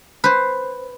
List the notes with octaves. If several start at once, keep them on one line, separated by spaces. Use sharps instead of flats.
B4 C5